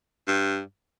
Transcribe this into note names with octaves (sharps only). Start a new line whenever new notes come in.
G2